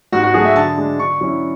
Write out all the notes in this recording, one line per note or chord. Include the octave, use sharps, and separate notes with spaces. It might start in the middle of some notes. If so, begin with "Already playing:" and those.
G#2 F#4
F#4
F#3 A3 G#4
E5
D3 A5
G#3 D4
D3 C#6
F#3 C#4 E4